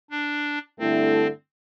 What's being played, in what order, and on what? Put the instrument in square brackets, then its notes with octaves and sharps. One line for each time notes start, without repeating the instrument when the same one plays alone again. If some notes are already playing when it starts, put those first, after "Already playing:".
[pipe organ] D4
[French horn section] G2 D3 A3 E4 A4 [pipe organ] C4